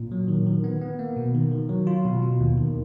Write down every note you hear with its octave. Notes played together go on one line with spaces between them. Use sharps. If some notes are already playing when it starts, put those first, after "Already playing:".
Already playing: A#2
F#3
D#3
D#3
B3
B3
A#3
B2
D#3
D#3
F#3
F4
B2
B2
D#2
D#3